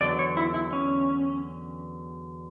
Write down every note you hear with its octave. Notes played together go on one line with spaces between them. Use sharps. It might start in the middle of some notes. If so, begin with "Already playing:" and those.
E2 D3 F#3 D5
C#5
E4
E4
C#4